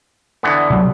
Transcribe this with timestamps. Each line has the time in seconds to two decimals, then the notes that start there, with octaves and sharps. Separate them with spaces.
0.43 D3 E3 B3
0.70 C3 F#3